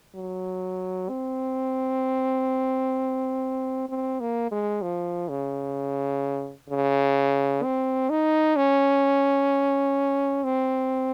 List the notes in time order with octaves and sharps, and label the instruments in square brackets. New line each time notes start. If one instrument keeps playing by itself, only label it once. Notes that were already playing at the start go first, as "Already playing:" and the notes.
[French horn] F#3
C4
C4
A#3
G#3
F3
C#3
C#3
C4
D#4
C#4
C4